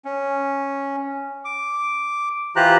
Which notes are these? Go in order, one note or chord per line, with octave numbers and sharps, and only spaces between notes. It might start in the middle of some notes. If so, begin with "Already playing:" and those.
C#4
D6
E3 F4 G4 C5 A#5 F#6